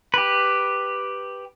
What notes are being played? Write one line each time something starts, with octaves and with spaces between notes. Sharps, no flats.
G4 B4